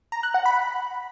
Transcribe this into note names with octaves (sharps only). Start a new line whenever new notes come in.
A#5
F#6
F#5
B5